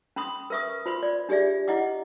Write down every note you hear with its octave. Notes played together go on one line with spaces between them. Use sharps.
C#4 B5 C6 D#6
A#4 B4 E5 C#6 D#6
F4 C5 B5 C6
D5
D4 G4 G#4 D5 E5
E4 D#5 F#5 D6